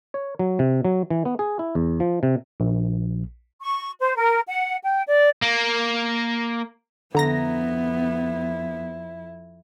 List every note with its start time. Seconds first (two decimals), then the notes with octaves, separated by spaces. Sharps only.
0.14 C#5
0.39 F#3
0.59 C3
0.85 F#3
1.10 E3
1.25 B3
1.39 G#4
1.59 E4
1.75 E2
2.00 F3
2.23 C3
2.60 A#1
3.61 C#6
4.00 C5
4.16 A#4
4.47 F#5
4.84 G5
5.08 D5
5.42 A#3
7.15 F2 D3 B3 E4 A#5 A#6